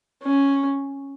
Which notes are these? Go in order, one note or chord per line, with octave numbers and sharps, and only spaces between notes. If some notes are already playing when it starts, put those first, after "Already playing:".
C#4